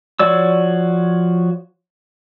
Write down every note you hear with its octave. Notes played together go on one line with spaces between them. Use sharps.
F3 F#4 C#5 D5 E6